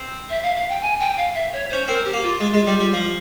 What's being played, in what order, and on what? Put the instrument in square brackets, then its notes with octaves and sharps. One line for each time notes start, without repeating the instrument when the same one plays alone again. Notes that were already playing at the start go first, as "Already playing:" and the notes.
Already playing: [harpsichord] C4
[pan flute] E5
F5
F5
G5
G#5
G5
F5
E5
C#5
[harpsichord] C#4 [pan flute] C5
[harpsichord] C4 [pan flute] A#4
[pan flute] G4
[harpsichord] A#3
[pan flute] F4
[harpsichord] G#3
G#3
G3
G3
F3